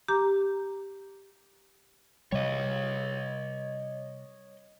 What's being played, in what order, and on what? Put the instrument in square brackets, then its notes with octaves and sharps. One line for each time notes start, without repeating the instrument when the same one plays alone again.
[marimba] G4 A#5 D6
[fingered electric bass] C3 G3 [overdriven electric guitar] C#5 D#5